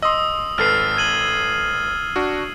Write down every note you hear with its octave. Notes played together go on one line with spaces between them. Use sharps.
D#5 C6 D#6 E6
G#1 A4 B4 F6 A6 C7
G#6 D#7 F#7
D4 F#4